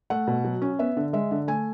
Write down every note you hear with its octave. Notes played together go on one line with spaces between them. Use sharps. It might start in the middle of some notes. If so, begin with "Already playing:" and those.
A3 F#5
B2
F#3
C#4
B3 E5
D3
G#3 E5
D3
A3 G#5